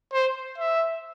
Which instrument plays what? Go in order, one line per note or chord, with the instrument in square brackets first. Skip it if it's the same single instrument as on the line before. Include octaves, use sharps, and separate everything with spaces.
[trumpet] C5
E5